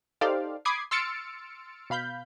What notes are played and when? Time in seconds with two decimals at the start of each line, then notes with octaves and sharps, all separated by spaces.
0.21 D#4 G4 A4 C5 D5 F5
0.65 B5 D6 D#6 G#6 C7
0.91 C6 E6 F6 A6 C#7 D7
1.90 B2 F5 B5 G6